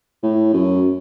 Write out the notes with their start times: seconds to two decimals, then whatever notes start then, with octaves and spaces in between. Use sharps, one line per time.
0.23 A2
0.53 F#2